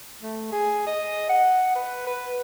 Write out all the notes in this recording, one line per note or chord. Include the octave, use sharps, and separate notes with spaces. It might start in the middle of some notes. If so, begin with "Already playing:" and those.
A3
G#4
D#5
F#5
B4
B4